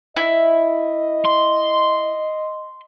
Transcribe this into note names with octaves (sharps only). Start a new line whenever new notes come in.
E4 D#5
C6